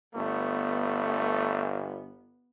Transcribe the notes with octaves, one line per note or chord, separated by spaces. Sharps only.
G1 A3 B3